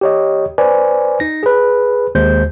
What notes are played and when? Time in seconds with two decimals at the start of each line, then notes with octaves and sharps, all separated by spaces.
0.01 G4 C#5 D#5
0.58 B4 C5 D5 G#5
1.20 D#4 A#6
1.43 G#4 B4
2.15 D#2 G#3 C5 G6